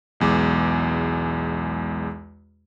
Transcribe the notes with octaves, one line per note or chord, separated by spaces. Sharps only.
B1 E2 G#3 D6